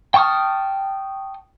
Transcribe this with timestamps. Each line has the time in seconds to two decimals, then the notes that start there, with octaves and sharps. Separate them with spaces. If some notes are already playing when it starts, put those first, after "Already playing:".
0.14 G5 A5 C#6 D#6 F6